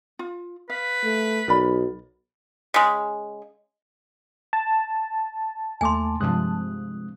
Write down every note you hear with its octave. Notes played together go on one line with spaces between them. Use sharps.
F4
B4 F5
A3
B1 A#4 D5 B5
C#3 G#3
A5
D#2 A3 G#5 C6 D6
G2 C3 F3 G#3 D#6 F#6